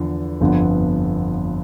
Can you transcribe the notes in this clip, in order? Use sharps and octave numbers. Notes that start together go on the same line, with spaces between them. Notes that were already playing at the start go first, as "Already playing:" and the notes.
Already playing: E2 D3 F3
G1 F2 D3 F3 B3